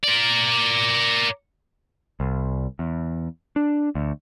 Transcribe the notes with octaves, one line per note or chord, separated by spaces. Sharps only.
A#4 D5
C2
E2
D4
D2